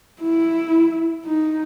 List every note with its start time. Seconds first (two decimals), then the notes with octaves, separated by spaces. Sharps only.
0.21 E4
1.26 D#4